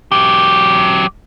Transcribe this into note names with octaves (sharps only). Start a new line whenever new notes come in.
F#3 G4